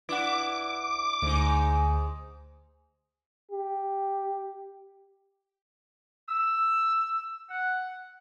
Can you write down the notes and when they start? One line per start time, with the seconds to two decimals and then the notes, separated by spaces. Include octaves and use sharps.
0.09 D4 E4 B4 F#5 D6
1.22 D2 G#2 D#4
3.51 G4
6.29 E6
7.50 F#5